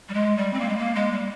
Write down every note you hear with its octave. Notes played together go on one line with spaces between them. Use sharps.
G3
G#3
G3
C4
A#3
G#3
A#3
G#3
G3